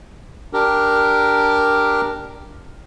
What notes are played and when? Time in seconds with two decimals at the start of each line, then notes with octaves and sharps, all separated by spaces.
0.53 D4 G4 A#4